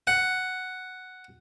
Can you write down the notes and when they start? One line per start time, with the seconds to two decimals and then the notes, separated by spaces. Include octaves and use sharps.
0.07 F#5